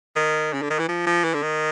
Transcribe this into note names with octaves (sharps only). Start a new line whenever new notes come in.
D#3
C#3
D3
D#3
E3
F3
F3
E3
D3
D#3